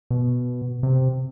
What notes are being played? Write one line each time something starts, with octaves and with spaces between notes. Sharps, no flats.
B2
C3